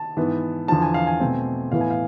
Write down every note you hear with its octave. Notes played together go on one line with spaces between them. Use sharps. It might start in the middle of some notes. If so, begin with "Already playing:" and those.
Already playing: A5
G#2 E3 B3
E2 D3 F3 A5
G#5
F5
G#5
B2 A3 C4
A2 E3 B3 F5
G#5
F5